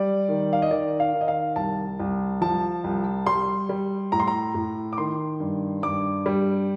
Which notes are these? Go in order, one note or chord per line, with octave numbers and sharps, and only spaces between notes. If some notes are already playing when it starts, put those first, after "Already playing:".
Already playing: G3 D5
D#3
F5
D#5
D#3 D5
F5
D#3
D#5
F5
C2 A5
C2
F3 A5
C2
G3 C6
G3
A2 A#5
C6
A#5
A2
D6
D#3 C6
G2
G2 D6
G3